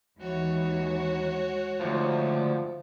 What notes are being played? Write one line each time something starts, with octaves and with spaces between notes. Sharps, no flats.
D#2 E3 G#3 D#4 F#4 C#5
D2 G#2 F3